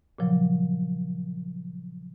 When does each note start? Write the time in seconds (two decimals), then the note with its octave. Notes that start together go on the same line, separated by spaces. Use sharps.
0.19 A#2 C#3 F3 F#3